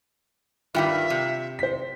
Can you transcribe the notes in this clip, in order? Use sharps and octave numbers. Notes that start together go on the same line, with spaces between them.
G2 D#3 G3 F4 E5 G5
C3
C5 B6